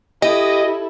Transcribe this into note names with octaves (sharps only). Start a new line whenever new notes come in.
E4 G4 A4 D#5